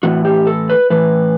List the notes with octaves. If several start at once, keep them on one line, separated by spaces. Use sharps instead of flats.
A2 E3 F#4
G4
A4
B4
A2 E3 B4